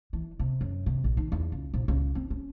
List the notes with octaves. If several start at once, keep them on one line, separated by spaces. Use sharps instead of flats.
E3
C3
F#2
C3
A#1
D#3
E2
C#2
A#1
C#2
C4
C#4